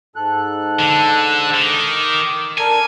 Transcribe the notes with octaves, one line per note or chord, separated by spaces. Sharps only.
G#2 A4 F#6
D3
D#3 D6
D4 A4 A#4 G#5